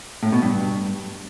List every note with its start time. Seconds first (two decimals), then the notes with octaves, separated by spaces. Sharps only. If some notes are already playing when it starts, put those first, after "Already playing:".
0.23 A2
0.32 B2
0.42 G2